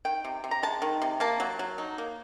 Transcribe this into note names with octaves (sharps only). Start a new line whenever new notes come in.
D#3 G5
C3
C3
A#5
G#3 A5
D#3
C3
A#3 A5
F#3
F#3
D#4
A#3